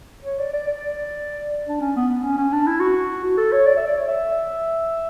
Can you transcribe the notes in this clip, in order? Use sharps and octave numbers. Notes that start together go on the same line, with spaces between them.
C#5
D5
D5
D5
D4
C#4
B3
B3
C#4
C#4
D4
E4
F#4
F#4
A4
C#5
D5
E5
D5
C#5
E5